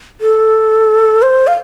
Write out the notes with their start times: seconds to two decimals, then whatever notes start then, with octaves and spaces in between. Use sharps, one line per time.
0.21 A4
1.22 C5
1.47 F5